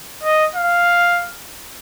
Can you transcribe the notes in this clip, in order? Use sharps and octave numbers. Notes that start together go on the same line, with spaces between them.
D#5
F5